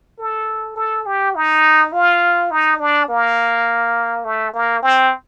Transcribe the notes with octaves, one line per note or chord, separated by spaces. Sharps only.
A4
A4
G4
D#4
F4
D#4
D4
A#3
A3
A#3
C4